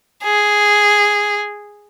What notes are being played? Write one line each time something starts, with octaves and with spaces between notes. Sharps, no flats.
G#4